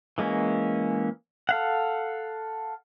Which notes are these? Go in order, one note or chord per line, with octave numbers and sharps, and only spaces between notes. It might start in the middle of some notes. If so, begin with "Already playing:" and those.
E3 G#3 A#3 C#4
A4 F5 F#5